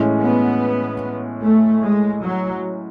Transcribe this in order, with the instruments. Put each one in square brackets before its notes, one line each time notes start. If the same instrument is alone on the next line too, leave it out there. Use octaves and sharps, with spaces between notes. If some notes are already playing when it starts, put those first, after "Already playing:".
Already playing: [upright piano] A2 E3 G#3 C#4
[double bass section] B3
A3
G#3
F#3